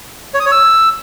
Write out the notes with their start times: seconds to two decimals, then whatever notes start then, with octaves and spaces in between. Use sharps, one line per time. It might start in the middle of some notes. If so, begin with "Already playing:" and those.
0.34 C#5
0.40 D#6
0.46 C#5
0.52 E6